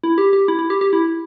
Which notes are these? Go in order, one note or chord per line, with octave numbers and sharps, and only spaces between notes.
E4
G4
G4
E4
E4
G4
G4
E4